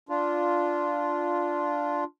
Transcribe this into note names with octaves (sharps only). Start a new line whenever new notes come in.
D4 F4